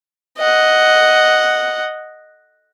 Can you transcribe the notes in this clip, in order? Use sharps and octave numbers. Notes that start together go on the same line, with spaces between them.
D#5 F#5